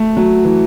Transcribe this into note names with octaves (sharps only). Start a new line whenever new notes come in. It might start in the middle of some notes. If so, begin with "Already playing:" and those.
Already playing: A3
F#3
E3